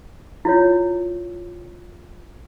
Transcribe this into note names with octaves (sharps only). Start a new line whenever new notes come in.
E4 F4 C#5